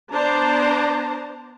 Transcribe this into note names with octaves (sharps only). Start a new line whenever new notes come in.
B3 D4 C5 D5 A5 A#5